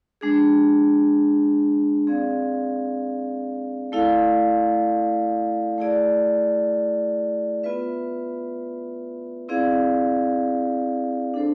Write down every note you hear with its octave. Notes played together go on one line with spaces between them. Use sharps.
G#3 D4 G#4
C4 G#4 D5 F5
A3 E4 A4 D5 F5
A3 E4 G#4 D5
B3 F4 B4 E5
C4 E4 G#4 D5 F5
D4 A4 C5